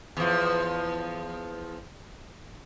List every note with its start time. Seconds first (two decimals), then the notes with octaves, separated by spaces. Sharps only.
0.17 E2 F3